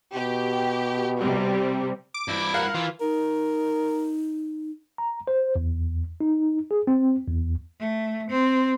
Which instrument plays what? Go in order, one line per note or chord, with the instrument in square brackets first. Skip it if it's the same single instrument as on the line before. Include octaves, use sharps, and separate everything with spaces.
[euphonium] B2 [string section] G4
[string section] C3 G3 C4
[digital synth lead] D6
[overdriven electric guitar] G2 E4
[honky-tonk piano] A#4 F5 F6 [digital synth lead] F#5
[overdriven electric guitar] E3 [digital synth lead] F4
[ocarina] D#4 [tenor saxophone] A#4
[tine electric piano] A#5
C5
E2
D#4
G#4
C4
E2
[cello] A3
C4